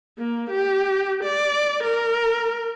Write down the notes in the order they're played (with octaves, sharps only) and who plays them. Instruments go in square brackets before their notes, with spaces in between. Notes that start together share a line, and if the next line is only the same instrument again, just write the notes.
[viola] A#3
G4
D5
A#4